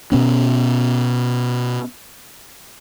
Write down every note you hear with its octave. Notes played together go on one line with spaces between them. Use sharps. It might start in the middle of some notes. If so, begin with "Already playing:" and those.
B2 B3 C#4